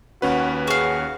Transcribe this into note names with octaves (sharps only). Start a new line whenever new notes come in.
D#2 C#4 F#4 B4
F#4 G#4 F5